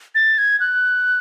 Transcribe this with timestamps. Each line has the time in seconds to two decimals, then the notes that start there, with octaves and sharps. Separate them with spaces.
0.15 A6
0.38 G#6
0.60 F#6